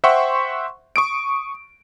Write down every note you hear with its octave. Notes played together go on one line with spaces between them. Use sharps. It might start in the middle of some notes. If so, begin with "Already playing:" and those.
C5 E5 F#5 G5 C6 C#6
C#6 D#6 D7